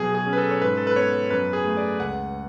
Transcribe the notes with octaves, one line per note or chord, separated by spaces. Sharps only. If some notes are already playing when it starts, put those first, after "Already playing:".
Already playing: B2 F#3 G#4
G#4
C#4
B4
A4
C#5
G#2 B4
A4
B4
B3 C#5
F#2 B4
G#4
A3
D5
C#2 F#5